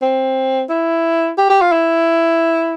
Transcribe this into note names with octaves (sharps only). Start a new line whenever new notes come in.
C4
E4
G4
G4
F4
E4